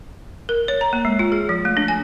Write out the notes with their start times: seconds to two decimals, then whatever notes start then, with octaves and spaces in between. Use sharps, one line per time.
0.49 A#4
0.68 C#5
0.81 A#5
0.93 A#3
1.05 G#3
1.19 F4
1.32 G#4
1.49 F3
1.65 A3
1.77 D4
1.88 G#5